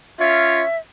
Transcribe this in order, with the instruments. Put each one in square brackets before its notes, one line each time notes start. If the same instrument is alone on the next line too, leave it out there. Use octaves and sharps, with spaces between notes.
[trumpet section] C#4 F4 C#5 [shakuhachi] E5